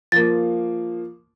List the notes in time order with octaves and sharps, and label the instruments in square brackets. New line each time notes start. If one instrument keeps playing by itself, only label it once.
[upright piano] F3 A#3 [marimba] A6